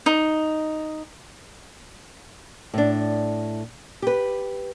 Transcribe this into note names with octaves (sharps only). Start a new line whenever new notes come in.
D#4
A2 D4
G4 B4